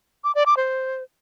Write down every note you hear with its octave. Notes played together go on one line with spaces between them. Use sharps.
D6
D5
D6
C5